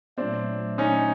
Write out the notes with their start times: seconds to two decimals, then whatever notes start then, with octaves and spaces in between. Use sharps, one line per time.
0.18 A#2 F#3 A3 C4 D4
0.78 C#4 D#4